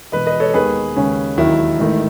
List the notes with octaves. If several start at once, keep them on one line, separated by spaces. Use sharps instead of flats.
E1 E2 B2 B4 D#5
B4 D#5
A4 C#5
D#2 D#3 G#3 B3 G#4 B4
D#2 C#3 G#3 C#4
E1 D#2 D#3 F#3 E4
A1 G#2 D#3 A3